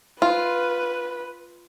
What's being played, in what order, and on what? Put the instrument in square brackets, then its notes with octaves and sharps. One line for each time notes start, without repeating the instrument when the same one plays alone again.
[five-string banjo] F4 [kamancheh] B4